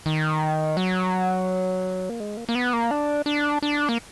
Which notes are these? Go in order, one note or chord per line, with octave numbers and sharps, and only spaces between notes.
D#3
F#3
A#3
G#3
A#3
A#3
B3
A#3
D4
D4
D4
A#3